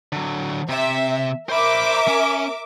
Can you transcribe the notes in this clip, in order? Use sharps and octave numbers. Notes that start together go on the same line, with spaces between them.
D3 F#3
C3 E5
A#4 C5 E5 B5 D6
C#4